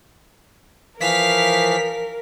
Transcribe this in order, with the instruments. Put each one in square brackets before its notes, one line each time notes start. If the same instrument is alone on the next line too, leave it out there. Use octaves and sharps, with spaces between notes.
[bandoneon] E3 F3 [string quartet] A#4 [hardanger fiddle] F5 [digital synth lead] B6